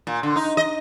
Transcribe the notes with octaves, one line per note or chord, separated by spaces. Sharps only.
A#2
D3
D#4
D#5